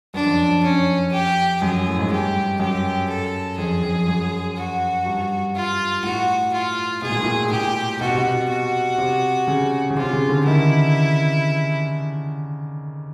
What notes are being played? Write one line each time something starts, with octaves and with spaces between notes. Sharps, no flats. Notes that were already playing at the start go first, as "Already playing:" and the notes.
F#2 D4
F2
F2
C#4
G4
F#2 G#4
A2
G#2
G2 G4
F#2 G4
A4
F2 G#4
F2
F#2
F#4
G2
F4
A2 F#4
F4
B2 G#4
A#2
A2
A#2
A#2 G4
B2 F#4
C3
B2
F#4
C3
C#3
C#3
C3 F4
C#3
D3
D#3 E4